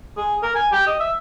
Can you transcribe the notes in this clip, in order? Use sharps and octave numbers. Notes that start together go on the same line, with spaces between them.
G#4
A#4
G#5
G4
D#5
E5